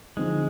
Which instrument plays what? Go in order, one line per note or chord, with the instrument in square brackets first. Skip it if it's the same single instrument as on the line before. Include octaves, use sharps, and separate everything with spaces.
[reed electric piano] D3 F3 C4 D#4 [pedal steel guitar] G#3